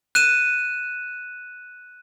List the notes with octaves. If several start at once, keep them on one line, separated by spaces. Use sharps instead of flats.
F#6 D#7 E7